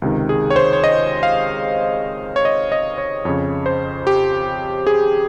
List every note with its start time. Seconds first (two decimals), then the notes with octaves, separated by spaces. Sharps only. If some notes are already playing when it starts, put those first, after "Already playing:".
0.02 C#2 C3 D#3
0.29 G#4
0.50 C#5
0.56 C5
0.73 C#5
0.84 D#5
1.23 F5
2.36 C#5
2.45 D#5
2.72 D#5
2.98 C#5
3.25 F2 C#3 C#5
3.66 C5
4.07 G4
4.87 G#4